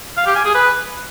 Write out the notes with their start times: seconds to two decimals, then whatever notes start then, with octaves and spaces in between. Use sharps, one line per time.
0.17 F5
0.27 G4
0.36 G#5
0.45 G#4
0.55 B4